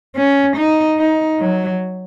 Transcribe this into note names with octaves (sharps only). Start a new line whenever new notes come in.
C#4
D#4
D#4
F#3